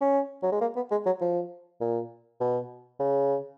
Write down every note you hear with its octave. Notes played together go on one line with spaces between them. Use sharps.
C#4
F#3
G#3
A#3
B3
G#3
F#3
F3
A#2
B2
C#3